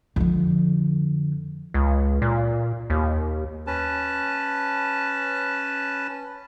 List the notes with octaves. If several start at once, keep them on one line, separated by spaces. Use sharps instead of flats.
F2 D3
C#2
A#2
D#2
C#4 B4 A5